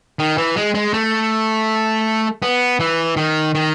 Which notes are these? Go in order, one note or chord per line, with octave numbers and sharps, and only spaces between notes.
D#3
E3
G#3
G#3
A3
B3
E3
D#3
D#3